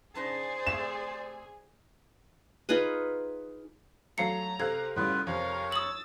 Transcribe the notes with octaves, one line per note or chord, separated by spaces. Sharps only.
C#3 D#4 G#4 C5 D5 A5
C3 A3 F5 E7
D#4 F4 G#4 B4
F#3 A3 F5 A#5 C7 C#7
C3 A4 F5 F#6 G#6
A2 C#3 G3 B3 E4 F4 B4
F2 C3 F3 A#4 C#5 F5
D#6 E6 A6 F#7